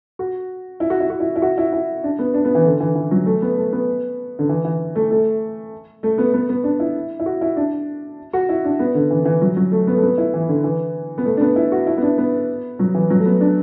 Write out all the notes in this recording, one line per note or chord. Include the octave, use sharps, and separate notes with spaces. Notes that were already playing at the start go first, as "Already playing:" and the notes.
F#4
E4
F#4
E4
F#4
E4
E4
F#4
E4
E4
D4
B3
D4
B3
E3
D3
E3
E3
F#3
A3
B3
A3
B3
D3
E3
E3
A3
A3
A3
B3
B3
B3
D4
E4
E4
F#4
E4
D4
F#4
E4
D4
B3
D3
E3
D3
E3
F#3
F#3
A3
B3
A3
B3
E4
E3
D3
E3
B3
A3
D4
B3
E4
F#4
E4
B3
D4
B3
F#3
E3
F#3
A3
B3
D4